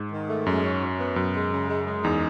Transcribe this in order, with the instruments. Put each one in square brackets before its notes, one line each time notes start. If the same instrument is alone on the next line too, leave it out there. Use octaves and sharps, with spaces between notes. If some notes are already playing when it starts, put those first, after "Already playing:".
Already playing: [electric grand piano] G#2
[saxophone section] D#3
A3
[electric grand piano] F#2 [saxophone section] G#3
[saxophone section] C#4
F#3
B3
[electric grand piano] F#2 [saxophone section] B2
[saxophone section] G#3
C#3
G#3
G#3
[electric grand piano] E2 [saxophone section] D#4